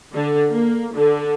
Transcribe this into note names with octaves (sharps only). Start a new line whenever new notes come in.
D3
A#3
D3